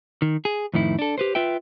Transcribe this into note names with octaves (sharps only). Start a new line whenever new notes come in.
D#3
G#4
F2 A2 D#3 E4
D4 A4
G4 B4 C5
F4 B4 E5 G5